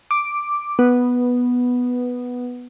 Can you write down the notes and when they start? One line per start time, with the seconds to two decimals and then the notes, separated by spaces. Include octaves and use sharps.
0.11 D6
0.79 B3